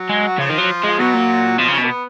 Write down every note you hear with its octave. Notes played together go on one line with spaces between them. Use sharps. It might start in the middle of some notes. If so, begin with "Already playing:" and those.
Already playing: F#3
G#3
F#4
C#3 F3 F4
D#3
F#3
G#3 F4
B2 F#3 F#4
A#2
B2 F3 F4
C#3 C#4
B2
A#3
B3